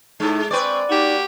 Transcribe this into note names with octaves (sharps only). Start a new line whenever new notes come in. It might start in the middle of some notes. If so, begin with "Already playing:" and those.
A2 G#3 D#4
G#3 C4 B4 D5 C#6
A#3 D#4 F#4 G4